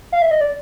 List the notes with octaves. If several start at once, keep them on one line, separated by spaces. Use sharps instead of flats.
F5
E5
D#5
D5